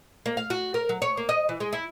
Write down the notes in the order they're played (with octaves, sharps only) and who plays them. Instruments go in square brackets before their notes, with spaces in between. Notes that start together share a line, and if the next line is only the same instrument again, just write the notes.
[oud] A#3
F5
F#4
A#4
F#3
C#5
A#3
D#5
E3
G#3
E4